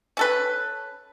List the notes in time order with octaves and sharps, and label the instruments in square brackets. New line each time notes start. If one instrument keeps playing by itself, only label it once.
[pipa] C#4 A4 B4